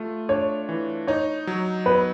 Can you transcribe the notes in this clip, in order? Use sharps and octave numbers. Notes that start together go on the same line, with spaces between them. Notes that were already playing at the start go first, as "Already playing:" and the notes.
Already playing: A3 F4
D4 C#5
E3
D#4 C#5
F#3
B3 B4